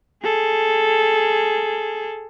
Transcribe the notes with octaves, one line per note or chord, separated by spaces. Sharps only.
G#4 A4